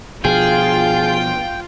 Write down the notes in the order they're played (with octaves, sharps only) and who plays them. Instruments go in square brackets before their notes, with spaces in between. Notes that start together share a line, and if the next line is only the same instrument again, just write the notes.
[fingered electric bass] B2 F3 [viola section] F4 [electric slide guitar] G#4 [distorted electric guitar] G5